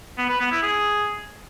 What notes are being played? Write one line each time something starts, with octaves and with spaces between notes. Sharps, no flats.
B3
B4
B3
E4
G#4